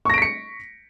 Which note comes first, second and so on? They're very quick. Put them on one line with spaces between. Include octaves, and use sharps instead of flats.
C#6 A#6 D7 B6 C#7